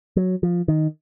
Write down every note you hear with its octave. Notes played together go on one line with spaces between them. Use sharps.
F#3
F3
D#3